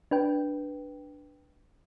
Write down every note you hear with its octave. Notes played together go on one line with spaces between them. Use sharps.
D4 B4 G5